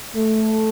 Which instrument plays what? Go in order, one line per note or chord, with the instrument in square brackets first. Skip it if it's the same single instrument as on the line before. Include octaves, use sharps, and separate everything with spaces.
[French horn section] A3